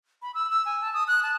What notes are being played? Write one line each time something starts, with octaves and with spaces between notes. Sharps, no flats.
B5
E6
E6
G#5
A5
D#6
F#6
A5